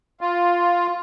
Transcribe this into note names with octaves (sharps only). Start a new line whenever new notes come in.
F4